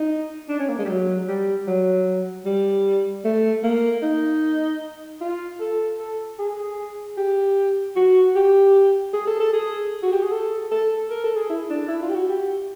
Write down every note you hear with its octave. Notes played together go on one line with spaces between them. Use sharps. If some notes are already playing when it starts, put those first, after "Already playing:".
Already playing: D#4
D4
C#4
A#3
G#3
G3
F#3
G3
F#3
G3
A3
A#3
D#4
F4
A4
A4
G#4
G4
F#4
G4
G#4
A4
A4
G#4
F#4
G4
G#4
A4
A4
A#4
A4
G#4
E4
D4
E4
F4
G4
F#4
G4